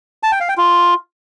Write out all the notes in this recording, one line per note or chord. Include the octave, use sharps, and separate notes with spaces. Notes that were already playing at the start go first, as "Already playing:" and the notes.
A5
G5
F5
G5
F4